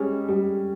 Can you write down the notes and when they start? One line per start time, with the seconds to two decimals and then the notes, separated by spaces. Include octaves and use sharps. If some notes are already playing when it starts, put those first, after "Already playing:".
Already playing: G3 G#3 C#4
0.29 G3